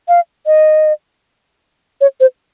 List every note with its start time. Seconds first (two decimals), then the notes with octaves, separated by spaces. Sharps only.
0.08 F5
0.46 D#5
2.01 C#5
2.20 C5